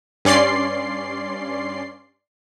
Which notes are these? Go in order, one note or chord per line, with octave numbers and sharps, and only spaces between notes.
G2 C#4 D5 C6 C7